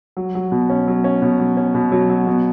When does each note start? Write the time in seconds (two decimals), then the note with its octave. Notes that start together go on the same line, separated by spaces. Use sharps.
0.17 F#3
0.35 F#3
0.52 B2
0.70 C#4
0.88 F#3
1.04 C#4
1.22 B2
1.39 F#3
1.57 C#4
1.75 B2
1.92 F#3
2.10 F#3
2.27 B2